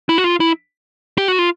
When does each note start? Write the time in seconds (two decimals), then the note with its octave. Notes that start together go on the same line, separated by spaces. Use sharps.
0.09 E4
0.18 F#4
0.24 F4
0.40 E4
1.18 G4
1.28 F#4
1.39 F4